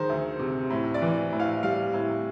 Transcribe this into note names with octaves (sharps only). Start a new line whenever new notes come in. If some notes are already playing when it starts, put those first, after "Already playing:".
Already playing: D#3 G#3 C5
D2
C3
A2
D5
E3
A2
F5
G3 F5
A2